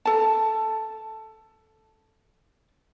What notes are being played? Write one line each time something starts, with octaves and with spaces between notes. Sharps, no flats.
A4 A5